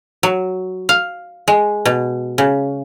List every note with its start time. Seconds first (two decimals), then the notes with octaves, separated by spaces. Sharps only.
0.23 F#3
0.89 F5
1.48 G#3
1.85 B2
2.38 C#3